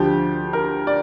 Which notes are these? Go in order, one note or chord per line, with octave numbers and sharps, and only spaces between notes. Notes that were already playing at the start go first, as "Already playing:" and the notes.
Already playing: D2 D3 F3 G4
A#4
D5